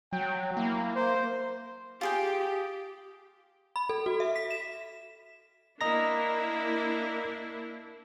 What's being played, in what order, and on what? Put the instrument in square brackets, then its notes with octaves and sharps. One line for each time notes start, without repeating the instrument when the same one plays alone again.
[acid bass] F#3 [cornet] G5
[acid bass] A#3 [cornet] E4
[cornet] C5
[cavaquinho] F4 G#4 G5 [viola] G4
[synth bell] B5
A4
F#4
E5
B6
E7
[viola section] A#3 D4 E4 [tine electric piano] D#5 A#5 A#6